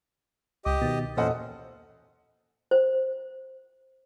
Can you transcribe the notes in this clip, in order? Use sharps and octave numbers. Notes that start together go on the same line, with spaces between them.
C#2 G4 D#5 D6
B2 D#3 A6
E2 A#2 C#4 A4 C5 D#5 F#5
C5